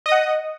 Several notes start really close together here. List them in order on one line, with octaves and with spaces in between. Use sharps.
D#5 D#6 F#5